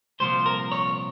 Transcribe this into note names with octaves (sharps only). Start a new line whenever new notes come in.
C2 A#2 F3 C5
A#4
C#5